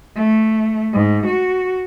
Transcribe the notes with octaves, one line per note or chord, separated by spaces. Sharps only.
A3
G#2
F#4